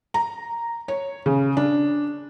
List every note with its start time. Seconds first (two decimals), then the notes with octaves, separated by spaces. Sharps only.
0.14 A#5
0.88 C#5
1.26 C#3
1.57 D4